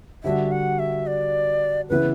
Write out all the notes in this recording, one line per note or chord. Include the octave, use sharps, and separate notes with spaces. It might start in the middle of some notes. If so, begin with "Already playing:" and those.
D3 G3 D4 F#4 E5
F#5
E5
D5
C#3 E3 B3 E4 B4